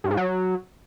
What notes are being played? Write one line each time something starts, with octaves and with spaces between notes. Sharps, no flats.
G2
G#2
F#3